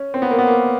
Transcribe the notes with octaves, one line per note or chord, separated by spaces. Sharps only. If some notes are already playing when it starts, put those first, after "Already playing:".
Already playing: C#4
C4
B3
A#3
B3
A#3